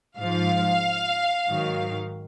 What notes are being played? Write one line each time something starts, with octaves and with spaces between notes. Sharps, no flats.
G#2 F3 F5
G#2 D#3 F#3